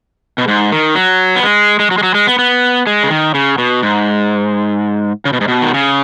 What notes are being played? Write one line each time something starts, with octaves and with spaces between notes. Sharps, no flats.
B2
G#2
D#3
F#3
B3
G#3
G#3
F#3
G#3
F#3
G#3
B3
B3
G#3
C#3
D#3
C#3
B2
G#2
C#3
B2
G#2
B2
D#3
C#3